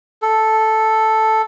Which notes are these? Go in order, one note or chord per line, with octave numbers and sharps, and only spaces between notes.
A4